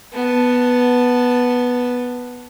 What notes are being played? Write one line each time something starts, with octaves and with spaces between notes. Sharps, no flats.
B3 A5